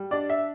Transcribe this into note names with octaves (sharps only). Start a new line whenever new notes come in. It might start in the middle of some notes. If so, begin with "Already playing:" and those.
Already playing: G3
D4 D5
E5